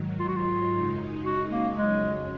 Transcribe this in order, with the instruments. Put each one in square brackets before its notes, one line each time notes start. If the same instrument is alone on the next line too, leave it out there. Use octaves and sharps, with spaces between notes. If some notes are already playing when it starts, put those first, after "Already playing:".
Already playing: [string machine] G#2 D#3 F#3
[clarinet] F4
F#4
F4
[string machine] F#2 C#3 G#3 D#4
[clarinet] F#4
A#3
[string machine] F2 C#3 F#3 C#4 [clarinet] G#3